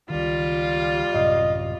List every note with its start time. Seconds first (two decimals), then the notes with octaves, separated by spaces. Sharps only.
0.10 C#2 D#3 G3 F4
1.14 A1 F#2 C3 D#5